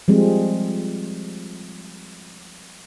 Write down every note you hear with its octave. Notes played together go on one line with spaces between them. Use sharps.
F3 G3 G#3 C4